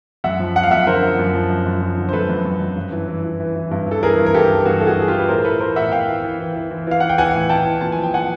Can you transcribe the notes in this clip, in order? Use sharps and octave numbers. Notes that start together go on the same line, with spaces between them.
F#2 E5 F#5
F3
F3 F#5
F5
F#2 E5 F#5
D3 A#4 C5
F3
F#2
F3
F#2
F#2
F3
D3
C5
F#2 A4 B4
F#2
F#2
F#2
G2
E3
E3
E3
E3
E3
G2
E3 A4
E3 G#4 A#4
G2
A#4
G2 G4 A4
E3
G2 F#4 G#4
E3 A4
F#4 G#4
E3 G#4
F4 G4
E3
B4
A2 A#4 C5
A2 A4 B4
E3 A#4 C5
A2 E5 F#5
A2 F5 G5
E3
E3
E3
E3
E3
E3 F5
E3 F#5
G5
E3 F#5 G#5
A2
A2 G5 A5
E3
A#2 A5
F3 G#5
G5
F3 F#5 G#5